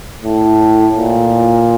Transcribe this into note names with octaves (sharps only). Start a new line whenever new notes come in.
A2
A#2